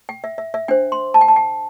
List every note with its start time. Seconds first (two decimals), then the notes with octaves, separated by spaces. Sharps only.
0.09 G5
0.24 E5
0.38 E5
0.54 E5
0.68 D4 C5 G5
0.92 C6
1.14 A5
1.21 G5
1.28 A5
1.36 G5